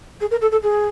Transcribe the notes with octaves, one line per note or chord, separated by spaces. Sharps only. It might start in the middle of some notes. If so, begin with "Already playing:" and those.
G#4
A#4
A4
A4
G#4